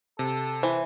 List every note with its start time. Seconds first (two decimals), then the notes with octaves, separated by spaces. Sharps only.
0.19 C3 A4
0.63 E3 C5